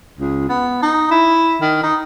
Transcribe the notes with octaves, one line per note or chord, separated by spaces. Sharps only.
C#2
B3
D#4
E4
D#3
D#4